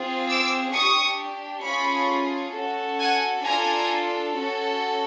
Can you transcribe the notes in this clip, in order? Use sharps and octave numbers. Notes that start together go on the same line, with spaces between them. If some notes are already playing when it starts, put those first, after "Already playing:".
Already playing: C4 F4 G#4
D6 E6
D4 G4 C#6 D#6
A3 C#4 F4 G#4 B5 C#6
C#4 F#4 A4
F#5 G#5
D4 F4 A4 G#5 A#5
C#4 F#4 A4